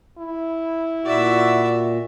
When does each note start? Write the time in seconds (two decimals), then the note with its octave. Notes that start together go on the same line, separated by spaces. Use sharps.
0.18 E4
1.05 A#2 F#4 D5 E5